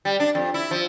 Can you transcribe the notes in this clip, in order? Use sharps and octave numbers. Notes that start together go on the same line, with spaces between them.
G3
D4
F2
E4
F3